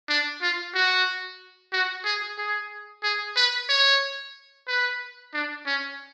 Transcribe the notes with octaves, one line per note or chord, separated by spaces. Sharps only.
D4
F4
F#4
F#4
G#4
G#4
G#4
B4
C#5
B4
D4
C#4